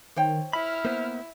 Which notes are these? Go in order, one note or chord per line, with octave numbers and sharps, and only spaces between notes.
D#3 C5 C#5 G5
E4 B5 F6
A#3 B3 C5